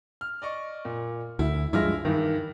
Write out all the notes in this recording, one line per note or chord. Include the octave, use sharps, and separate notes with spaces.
F6
D5 D#5 C#6
A#2
D2 E4
G2 F3 G#3 E4 F6 A#6
G2 D#3 E3